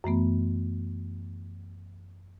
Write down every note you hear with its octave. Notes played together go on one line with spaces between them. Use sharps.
F#2 E3 A3 B3